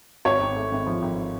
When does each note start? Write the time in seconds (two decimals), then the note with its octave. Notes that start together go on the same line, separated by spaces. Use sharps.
0.25 G#1 C#5
0.41 G#1
0.56 A3
0.71 G#1
0.86 F3
1.02 G#1